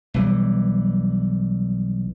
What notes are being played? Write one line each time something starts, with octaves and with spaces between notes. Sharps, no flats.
B1 E3 G3